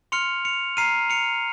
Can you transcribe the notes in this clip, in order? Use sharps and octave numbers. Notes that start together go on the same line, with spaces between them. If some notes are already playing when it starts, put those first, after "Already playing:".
C6 F6 C#7 F7
C#7 F7
A#5 F6 C7 D#7
C#7 F7